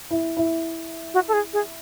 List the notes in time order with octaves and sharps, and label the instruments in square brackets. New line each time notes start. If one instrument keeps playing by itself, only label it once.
[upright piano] E4
E4
[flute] F#4
A4
G#4
G#4